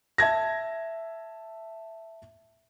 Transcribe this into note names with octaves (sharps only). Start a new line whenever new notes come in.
E5 A5 G#6 A#6